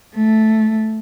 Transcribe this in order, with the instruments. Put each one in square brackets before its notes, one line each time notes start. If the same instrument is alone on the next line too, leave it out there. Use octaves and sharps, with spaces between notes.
[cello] A3